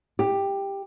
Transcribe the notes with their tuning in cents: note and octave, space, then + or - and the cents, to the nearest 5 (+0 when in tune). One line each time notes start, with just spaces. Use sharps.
G4 +10